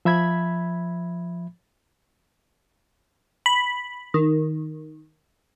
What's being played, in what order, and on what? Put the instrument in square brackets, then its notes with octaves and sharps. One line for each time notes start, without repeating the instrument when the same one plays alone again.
[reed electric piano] F3 E5 B5 G#6
[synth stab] B5
D#3